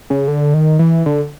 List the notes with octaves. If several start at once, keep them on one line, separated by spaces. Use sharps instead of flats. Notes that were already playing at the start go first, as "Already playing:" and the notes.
C#3
D3
D#3
E3
D3